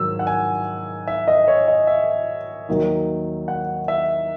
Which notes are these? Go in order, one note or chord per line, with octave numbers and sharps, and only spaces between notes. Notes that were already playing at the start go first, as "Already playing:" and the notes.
Already playing: G#2 D#3 F#3 E6
F#5
G#5
E5
D#5
C#5
D#5
E5
D#2 D#3 F#3
F#5
E5